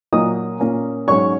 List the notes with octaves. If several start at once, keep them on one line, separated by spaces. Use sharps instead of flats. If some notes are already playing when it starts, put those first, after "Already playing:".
A#2 F#3 A#3 D#5 D#6
A#2 A#3 C#4
G#2 F#3 C#4 C#5 C#6